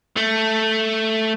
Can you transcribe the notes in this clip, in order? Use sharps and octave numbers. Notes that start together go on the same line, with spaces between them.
A3